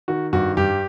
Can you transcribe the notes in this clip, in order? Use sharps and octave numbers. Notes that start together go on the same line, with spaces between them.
D#3 F#4
G2 F#4
G2 G4